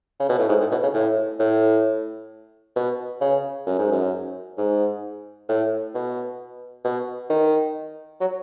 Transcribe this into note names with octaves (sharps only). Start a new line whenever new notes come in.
C#3
B2
A2
G#2
A2
B2
C#3
A2
A2
B2
C#3
F#2
G#2
F#2
G#2
A2
B2
B2
D#3
F#3